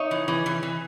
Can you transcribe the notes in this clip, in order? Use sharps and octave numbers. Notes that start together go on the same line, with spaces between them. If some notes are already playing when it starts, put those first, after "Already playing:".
Already playing: D#4 C#5 E5
E3
E3
E3
E3